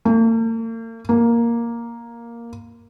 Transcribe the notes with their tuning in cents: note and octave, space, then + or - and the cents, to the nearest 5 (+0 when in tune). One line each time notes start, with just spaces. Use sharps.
A#3 -45
A#3 +5